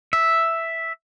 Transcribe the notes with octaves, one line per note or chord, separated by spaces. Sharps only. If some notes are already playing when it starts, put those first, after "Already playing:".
E5